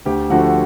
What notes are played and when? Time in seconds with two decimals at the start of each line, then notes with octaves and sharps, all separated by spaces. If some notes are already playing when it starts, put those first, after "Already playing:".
0.06 D2 G4
0.30 D3 F3 A3 F#4